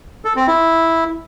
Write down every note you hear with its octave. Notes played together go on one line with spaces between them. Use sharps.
A4
C4
E4